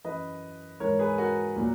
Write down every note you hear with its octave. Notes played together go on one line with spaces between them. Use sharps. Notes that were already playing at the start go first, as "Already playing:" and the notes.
F#2 E3 B4 D#5
G#2 E3 A#4 C#5
G#4 B4
F#4 A#4
A#2 F#3